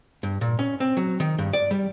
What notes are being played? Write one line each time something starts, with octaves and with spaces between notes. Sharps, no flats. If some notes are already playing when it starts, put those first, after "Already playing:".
G2
A#2
C#4
C4
F#3
D#3
G2
D5
G3